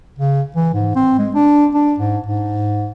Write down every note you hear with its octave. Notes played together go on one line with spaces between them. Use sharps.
C#3
E3
G#2
C4
G#3
D4
D4
G#2
G#2